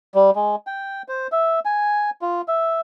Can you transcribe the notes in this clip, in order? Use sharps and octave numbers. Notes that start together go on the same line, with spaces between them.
G3
G#3
G5
C5
E5
G#5
F4
E5